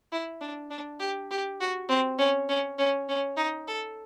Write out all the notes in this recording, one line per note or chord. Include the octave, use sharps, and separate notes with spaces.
E4
D4
D4
G4
G4
F#4
C4
C#4
C#4
C#4
C#4
D#4
A4